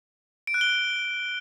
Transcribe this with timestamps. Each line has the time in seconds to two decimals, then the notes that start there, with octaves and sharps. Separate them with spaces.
0.47 D7
0.54 F#6
0.61 G7